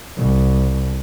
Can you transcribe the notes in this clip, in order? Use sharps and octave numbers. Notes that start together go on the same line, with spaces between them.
C2